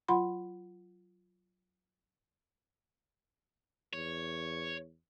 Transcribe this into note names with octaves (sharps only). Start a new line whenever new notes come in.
F#3 F4 F#5 B5 C6
E2 C#5